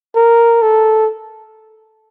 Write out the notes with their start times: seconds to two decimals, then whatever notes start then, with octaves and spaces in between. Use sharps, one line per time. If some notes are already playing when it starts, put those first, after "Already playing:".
0.16 A#4
0.62 A4